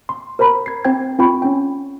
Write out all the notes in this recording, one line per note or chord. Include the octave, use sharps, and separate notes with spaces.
C6
A#4 C5 A#5 B5
G#6 C7
C4 C5 G5 G#6
C4 F4 A4 G5 B5 C#6
C#4 G5